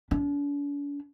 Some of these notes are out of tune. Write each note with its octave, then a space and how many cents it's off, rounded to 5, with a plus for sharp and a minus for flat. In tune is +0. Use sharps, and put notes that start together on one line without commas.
D4 -45